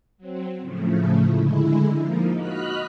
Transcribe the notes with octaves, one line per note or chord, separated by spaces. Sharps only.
F#3 C4
A2 C#3 F3 A3
D3 G#3 E4
F3 A#3 D#4
F#4 D#5 B5 F6 F#6 B6